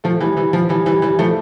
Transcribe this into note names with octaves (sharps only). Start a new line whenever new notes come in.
F3 A3
E3 G3
E3 G3
F3
E3 G3
E3 G3
E3 G3
F3 A3